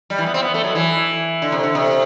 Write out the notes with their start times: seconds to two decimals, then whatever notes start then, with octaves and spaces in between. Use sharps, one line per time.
0.10 G3
0.18 E3
0.26 B3
0.34 C4
0.42 B3
0.54 A3
0.64 F#3
0.75 E3
1.42 D3
1.52 C3
1.63 D3
1.75 C3